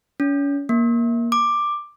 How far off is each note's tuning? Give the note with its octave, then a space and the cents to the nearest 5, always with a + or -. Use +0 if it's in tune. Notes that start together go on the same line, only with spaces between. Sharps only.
C#4 +35
A#3 +10
D6 +10